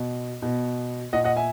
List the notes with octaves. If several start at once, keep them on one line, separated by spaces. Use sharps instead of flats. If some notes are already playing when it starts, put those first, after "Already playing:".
Already playing: B2
B2
A#2 D#5 F#5
D#5 F#5
E5 G#5